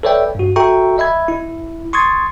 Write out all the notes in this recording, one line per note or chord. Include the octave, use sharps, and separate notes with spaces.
A4 B4 C#5 D5 E5 G5
G2 F#4
F#4 A4 E5 G5 A#5 C#6
D#5 E5 B5 G#6
E4
C6 C#6 D#6 G#6 A6